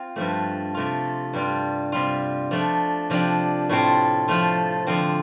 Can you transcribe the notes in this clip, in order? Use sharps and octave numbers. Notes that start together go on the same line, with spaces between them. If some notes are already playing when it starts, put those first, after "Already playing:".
Already playing: C4 F4
G2 F3 A3
C3 A3 F4
G2 G3 F4
C3 G3 F4
F3 A3 D4
C3 F3 D4 G4
A2 A3 C4 F4
F3 A3 F4
D3 F3 C4